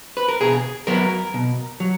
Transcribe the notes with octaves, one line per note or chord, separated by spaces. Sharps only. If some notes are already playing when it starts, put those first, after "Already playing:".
B4
A#4
B2 G#4
F#3 B3 A#4
B2
F#3